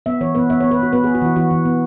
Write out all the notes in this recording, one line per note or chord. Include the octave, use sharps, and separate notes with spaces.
B3 E5
E3 C#5
B3 B4
B3 E5
C#5
B3
B4
B3 F#4
B3 B4
G#4
B3
F#4
E3 E4
E3 F#4
E3
B3